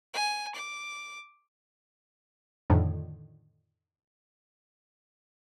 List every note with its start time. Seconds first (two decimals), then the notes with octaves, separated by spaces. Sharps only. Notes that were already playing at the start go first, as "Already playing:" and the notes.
0.13 G#5
0.55 D6
2.70 F2 A2 D3 D#3